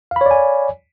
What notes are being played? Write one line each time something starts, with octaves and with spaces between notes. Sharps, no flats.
C#5 D5 F5 G#5 B5